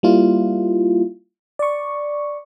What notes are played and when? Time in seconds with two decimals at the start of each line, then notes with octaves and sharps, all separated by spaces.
0.03 G3 A#3 E4 F4
1.59 D5 C#6